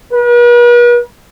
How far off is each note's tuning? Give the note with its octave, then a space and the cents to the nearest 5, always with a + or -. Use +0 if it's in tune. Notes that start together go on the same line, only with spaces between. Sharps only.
B4 -45